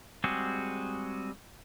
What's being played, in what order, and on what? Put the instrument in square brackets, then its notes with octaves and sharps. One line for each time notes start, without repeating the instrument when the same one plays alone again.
[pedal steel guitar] G3 G#3 C4 F#4 G#4